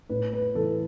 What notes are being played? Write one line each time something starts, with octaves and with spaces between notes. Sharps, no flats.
A2 B4
B4
E3 A4